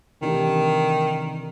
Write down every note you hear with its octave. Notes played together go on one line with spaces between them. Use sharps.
C3 D#3 E3 A3 D4 G4